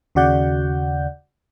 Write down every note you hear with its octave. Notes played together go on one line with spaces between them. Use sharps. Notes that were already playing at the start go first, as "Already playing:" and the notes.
D#2 C#3 F#4 D5 F#5 G6